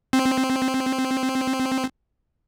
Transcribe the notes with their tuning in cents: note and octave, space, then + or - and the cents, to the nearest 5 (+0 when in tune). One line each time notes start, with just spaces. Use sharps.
C4 +0